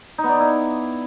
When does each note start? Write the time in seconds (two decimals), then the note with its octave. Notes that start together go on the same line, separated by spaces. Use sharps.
0.18 D#4
0.24 B3
0.29 D5
0.34 D#4
0.40 E4